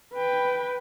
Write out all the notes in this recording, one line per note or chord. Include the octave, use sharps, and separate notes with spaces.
B4 G5